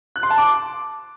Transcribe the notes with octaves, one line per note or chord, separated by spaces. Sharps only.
F#6
C6
A5
D6